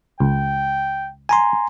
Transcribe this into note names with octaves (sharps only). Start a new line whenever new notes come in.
C#2 G5
G#5 A#5 C6